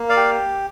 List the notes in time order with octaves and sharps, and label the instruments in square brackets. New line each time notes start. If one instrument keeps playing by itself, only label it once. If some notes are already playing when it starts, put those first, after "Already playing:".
Already playing: [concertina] A#3
D5 F5
G4